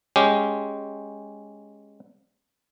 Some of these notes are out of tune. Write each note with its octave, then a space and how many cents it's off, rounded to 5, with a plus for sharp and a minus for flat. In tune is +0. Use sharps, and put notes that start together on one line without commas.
G#3 +0 C#4 +0 G4 +0